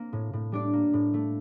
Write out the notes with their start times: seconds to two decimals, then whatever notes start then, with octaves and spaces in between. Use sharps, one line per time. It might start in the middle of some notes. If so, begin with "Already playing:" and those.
Already playing: A#3 C4 D4
0.13 A2
0.33 A2
0.52 G3 D4 D5
0.73 A#3
0.93 A2
1.14 A3